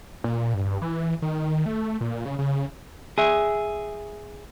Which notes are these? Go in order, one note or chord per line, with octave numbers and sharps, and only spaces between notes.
A#2
G2
E3
D#3
A3
A#2
C#3
C#3
G#4 E5